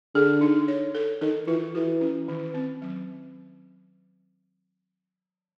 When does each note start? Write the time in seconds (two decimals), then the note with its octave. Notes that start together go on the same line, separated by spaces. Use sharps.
0.15 D3 G#4
0.41 D#4
0.68 C#5
0.95 A4
1.21 D#3 A4
1.48 E3 F4
1.75 E3 F#4
2.01 C#4
2.28 D#3
2.54 C4
2.82 F#3